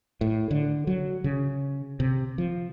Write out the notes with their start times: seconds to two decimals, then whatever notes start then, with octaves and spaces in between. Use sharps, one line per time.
0.21 A2
0.51 D3
0.87 F#3
1.24 C#3
2.00 C3
2.38 F3